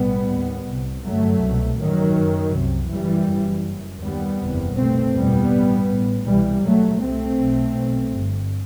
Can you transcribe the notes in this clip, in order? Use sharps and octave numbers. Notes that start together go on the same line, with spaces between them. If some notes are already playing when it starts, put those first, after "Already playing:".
Already playing: B1 A2 G3 B3
D#2
C2 C3
G1 F#2 F#3 A3
C2 B2
A1 G2 D#3 F#3
F#1 F#2
C2 C3
G1 F#2 E3 G3
F#1 F#2
F#1 F#2
D#2 G3 B3
F#1 E2 C3
C2 B2 A3 C4
F#1 E2 B2 G3 B3
A1 G2
A1 A2
C2 B2 E3 G3
D#2 F#3 A3
C2 C3 A3 C4
B1 B2
B1 B2
G1 G2